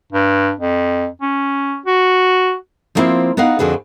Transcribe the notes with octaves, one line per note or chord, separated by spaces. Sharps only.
G2
F2
C#4
F#4
F3 G3 A#3 C4 E4 F4
B3 D#4 A#4 F5 F#5
F2 D3 F#4 G#4 B4